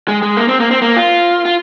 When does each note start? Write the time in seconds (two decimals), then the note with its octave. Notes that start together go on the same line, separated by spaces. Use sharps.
0.08 G#3
0.22 G#3
0.37 A#3
0.48 C4
0.60 A#3
0.71 C4
0.82 A#3
0.97 F4
1.45 F4